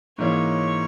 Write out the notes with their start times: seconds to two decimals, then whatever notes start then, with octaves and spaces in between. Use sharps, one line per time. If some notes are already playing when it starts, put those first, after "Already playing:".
0.18 G#2 E3 A#3 C#4 C#5